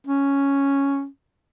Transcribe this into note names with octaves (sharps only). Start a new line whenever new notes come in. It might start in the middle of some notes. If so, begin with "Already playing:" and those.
C#4